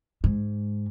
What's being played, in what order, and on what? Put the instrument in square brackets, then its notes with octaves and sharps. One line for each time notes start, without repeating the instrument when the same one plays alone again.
[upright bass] G#2